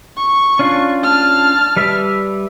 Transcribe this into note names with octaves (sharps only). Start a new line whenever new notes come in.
C#6
C#4 D4 F4
A5 F6
G3 B4 E5